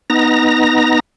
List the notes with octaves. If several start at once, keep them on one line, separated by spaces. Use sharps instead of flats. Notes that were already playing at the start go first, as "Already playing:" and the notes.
B3 D#4 A#5 A#6